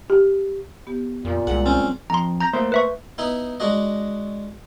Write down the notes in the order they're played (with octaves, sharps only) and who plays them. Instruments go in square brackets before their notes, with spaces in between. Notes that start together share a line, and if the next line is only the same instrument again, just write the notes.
[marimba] G4
B3 G4
[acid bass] F2 [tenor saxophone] A#2
[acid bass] C2 [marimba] G#3 G#4 [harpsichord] F#5
[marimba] F#3 [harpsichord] C4 C#4
[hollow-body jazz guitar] F2 [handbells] A#5 C6
[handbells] A#5 G6 A#6
[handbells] A3 [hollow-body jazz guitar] A#3 C5
[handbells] B4 E5 C#6
[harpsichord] B3 D#4 E4
G#3 D4 F#4 D#5